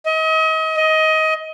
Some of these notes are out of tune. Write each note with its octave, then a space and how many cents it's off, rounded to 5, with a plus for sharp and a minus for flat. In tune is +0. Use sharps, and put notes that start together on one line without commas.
D#5 +35
D#5 +20